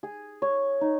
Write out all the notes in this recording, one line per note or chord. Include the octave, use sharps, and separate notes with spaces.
G#4
C#5
D#4